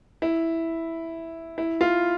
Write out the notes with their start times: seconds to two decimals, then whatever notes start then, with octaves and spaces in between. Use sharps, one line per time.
0.22 E4
1.58 E4
1.81 F4